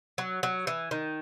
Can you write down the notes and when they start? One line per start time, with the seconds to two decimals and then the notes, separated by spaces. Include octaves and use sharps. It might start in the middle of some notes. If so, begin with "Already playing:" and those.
0.18 F#3
0.43 F#3
0.67 E3
0.91 D#3